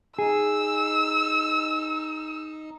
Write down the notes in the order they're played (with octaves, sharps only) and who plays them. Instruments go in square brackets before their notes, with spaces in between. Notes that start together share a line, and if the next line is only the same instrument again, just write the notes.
[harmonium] D#4 [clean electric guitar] G#4 [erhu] E6